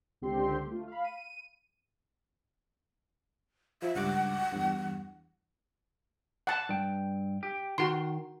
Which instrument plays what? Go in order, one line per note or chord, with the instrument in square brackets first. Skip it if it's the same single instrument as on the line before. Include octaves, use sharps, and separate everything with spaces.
[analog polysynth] C#2 D3 C4 G4 C6
A3 F4
F5 B5
D#7
[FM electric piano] F3 [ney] E5
[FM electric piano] C#2 G2 D6 [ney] F#5
[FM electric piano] E2 G2
[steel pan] F#5 A5
[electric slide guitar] G2 G5
G4
[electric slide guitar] D#3 [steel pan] F#4 C6